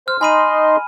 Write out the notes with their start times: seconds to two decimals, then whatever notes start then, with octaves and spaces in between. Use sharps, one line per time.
0.08 C5 F6
0.21 D#4 D#5 G#5 B5 C6 D#7